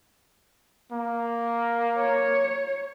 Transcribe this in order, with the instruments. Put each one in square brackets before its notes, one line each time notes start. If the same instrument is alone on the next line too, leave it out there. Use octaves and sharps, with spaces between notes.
[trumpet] A#3
[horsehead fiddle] C#5